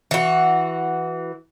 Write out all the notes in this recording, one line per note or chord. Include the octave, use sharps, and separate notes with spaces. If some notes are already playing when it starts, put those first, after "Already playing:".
E3 F#4